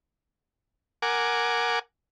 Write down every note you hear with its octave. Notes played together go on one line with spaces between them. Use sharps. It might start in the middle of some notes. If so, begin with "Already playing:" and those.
A#4 F#5 G#5 D6